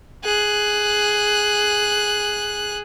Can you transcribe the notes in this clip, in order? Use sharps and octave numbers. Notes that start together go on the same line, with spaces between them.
G#4 F#6